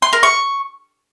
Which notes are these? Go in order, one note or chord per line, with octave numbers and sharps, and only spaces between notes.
C6
A#4
C#6